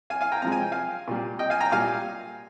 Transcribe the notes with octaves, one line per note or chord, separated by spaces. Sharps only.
F5 G#5
F5 G#5
G5 A#5
C3 F3 G#3 A#5
G#5
G5
F5 G#5
A#2 G3
D#5 G5
F5 G#5
G5 A#5
A#2 G3 F5 G#5